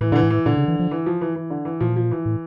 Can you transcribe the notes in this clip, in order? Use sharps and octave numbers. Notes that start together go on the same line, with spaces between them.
A2 E3
A#2 D3 E3
A2
E3
A#2 D3
C#3
E3
F3
E3
F3
E3
E3
D3
E3
A#2 F3
F3
E3
A2